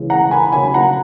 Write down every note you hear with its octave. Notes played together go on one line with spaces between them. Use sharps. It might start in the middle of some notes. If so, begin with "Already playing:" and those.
Already playing: C#3 E3 G#3
F#5 A#5
G#5 B5
C#3 F#3 G#5 B5
F#5 A#5